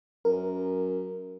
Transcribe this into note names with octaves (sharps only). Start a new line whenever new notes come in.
F#2 A#4